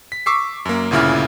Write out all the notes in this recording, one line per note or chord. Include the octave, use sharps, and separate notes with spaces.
B6
C#6 D6 E6 B6 C7
F#2 A#3
G1 D2 A#2 C#3 E4 F6